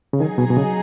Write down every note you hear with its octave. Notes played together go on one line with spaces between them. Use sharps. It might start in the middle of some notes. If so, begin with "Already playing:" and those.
C#3
D#3 F#3 D#4 G#4
B2
B2
C#3